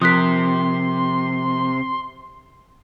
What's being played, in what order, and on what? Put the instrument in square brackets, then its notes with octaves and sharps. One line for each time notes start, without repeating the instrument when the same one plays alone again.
[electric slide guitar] C3 [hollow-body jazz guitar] F3 A#4 [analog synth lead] C6 [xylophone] D#6 F#6 B6